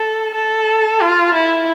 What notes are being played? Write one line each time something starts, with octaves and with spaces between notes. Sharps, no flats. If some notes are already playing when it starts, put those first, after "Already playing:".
Already playing: A4
A4
F4
E4